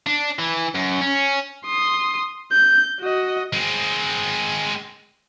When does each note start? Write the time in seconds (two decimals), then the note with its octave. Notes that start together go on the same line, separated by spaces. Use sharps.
0.07 D4
0.39 E3
0.75 F#2
1.01 C#4
1.66 C6 D#6
2.52 G6
3.01 F#4 D#5
3.53 G#3 C4